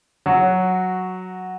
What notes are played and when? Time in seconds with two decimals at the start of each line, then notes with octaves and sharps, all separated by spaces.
0.26 F#3 F#4